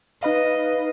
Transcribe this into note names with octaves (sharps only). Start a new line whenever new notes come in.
D#4 B4 D#5 F5